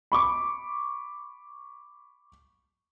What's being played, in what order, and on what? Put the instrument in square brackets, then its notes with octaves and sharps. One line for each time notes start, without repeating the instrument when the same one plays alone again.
[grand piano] B5 C#6 D6